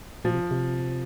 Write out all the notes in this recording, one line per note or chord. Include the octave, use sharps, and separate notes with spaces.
A#2 F3
C3
C3